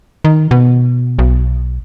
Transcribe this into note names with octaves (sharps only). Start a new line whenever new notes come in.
D#3
B2
B1